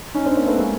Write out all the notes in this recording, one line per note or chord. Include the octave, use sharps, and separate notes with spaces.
C#4 D#4
C4 D4
A#3 C4
A3 B3
G#3 A#3